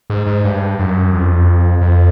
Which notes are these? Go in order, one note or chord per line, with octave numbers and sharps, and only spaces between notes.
G#2
G#2
G2
F#2
F2
F2